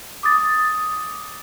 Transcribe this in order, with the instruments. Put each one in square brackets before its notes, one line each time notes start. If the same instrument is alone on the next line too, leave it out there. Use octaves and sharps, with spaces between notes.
[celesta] D6 D#6 A6